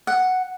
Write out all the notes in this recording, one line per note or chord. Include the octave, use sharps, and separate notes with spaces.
F#5